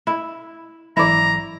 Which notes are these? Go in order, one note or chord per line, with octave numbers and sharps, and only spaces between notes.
E4
G#1 E3 F#3 E4 D5 A#5